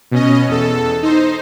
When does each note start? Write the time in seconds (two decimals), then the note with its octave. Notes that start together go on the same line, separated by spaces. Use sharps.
0.11 B2 C#4 D#5
0.49 E2 A4
1.03 D#4 C5